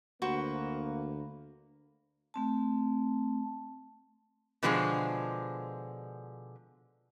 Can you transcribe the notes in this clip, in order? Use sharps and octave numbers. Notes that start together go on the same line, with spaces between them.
D2 A#3 F#4 B4 C5
A3 C4 A5
B2 D3 F3 G#3 D4 G#4